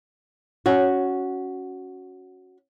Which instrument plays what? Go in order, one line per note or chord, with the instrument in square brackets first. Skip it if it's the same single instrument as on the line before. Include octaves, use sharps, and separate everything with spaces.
[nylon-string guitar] C#4 F#4